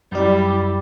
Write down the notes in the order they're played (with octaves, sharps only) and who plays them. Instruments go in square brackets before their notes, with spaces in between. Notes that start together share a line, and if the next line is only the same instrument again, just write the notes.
[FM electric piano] F#2 D5 [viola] G3 E4